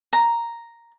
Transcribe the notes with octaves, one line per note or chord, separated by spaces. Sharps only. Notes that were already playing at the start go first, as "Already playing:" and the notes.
A#5